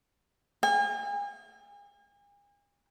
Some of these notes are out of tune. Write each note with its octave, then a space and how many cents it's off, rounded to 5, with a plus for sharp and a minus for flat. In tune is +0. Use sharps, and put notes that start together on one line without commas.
G#5 -40